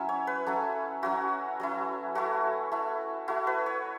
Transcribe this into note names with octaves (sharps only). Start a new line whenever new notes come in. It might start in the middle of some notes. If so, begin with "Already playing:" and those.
Already playing: F#3 C#4 E4 E5
C#5
B4
F#3 C#4 E4 A4
F#3 C#4 E4 F#4
F#3 C#4 E4
A3 E4 F#4
A3 E4
A3 E4 F#4
B4
C#5